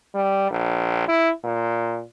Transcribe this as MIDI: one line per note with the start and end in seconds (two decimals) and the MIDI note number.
0.14 0.49 55
0.51 1.07 34
1.08 1.31 64
1.44 2.02 46